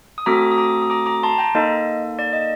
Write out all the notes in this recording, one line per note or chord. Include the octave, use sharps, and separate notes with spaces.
D#6
A3 C4 F#4 A4 A#5 D6
D#6
A#5 D6
D#6
A#5 D6
A#5 D6
A5 C6
G5 A#5
A#3 D#4 A4 D#5
D5
D#5